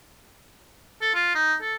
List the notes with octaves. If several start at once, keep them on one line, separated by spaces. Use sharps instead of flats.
A4
F4
D#4
A4